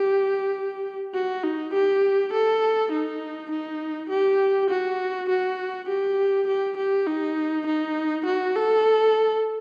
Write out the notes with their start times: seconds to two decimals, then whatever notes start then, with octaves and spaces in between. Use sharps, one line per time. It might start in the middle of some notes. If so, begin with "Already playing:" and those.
Already playing: G4
1.14 F#4
1.44 D#4
1.73 G4
2.33 A4
2.92 D#4
3.51 D#4
4.10 G4
4.70 F#4
5.29 F#4
5.88 G4
6.47 G4
6.77 G4
7.07 D#4
7.67 D#4
8.26 F#4
8.56 A4